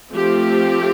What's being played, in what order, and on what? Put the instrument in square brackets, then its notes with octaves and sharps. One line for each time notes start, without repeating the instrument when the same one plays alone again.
[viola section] F3 A3 C4 G4